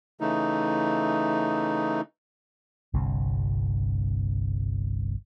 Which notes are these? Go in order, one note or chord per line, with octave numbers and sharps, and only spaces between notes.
C#3 E3 A3 D#4
G1 C2 G2 C3